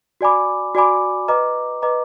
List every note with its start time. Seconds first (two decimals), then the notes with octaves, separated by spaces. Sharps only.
0.21 F#4 D5 G#5 B5 D6
0.75 F#4 D5 G#5 B5 D6
1.28 B4 D#5 A#5 D6
1.82 B4 D#5 A#5 D6